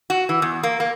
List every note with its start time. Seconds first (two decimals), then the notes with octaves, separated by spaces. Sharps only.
0.10 F#4
0.29 E3
0.42 E2
0.63 A#3
0.80 A#3